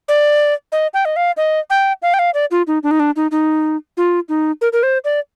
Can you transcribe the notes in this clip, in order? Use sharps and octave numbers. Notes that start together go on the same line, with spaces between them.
D5
D#5
G5
D#5
F5
D#5
G5
F5
G5
F5
D5
F4
D#4
D4
D#4
D4
D#4
D#4
F4
D#4
A#4
A#4
C5
D5